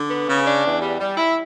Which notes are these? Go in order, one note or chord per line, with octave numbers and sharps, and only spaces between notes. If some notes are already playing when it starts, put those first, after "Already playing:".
Already playing: D3
B3
C#3
D4
E2
G3
G3
E4